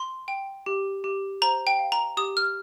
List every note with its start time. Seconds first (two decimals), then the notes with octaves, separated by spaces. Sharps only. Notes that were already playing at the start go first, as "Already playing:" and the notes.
Already playing: C6
0.28 G5
0.66 G4
1.04 G4
1.42 C5 A#5
1.67 G5
1.79 F5
1.92 A#5
2.17 G4 D#6
2.37 F6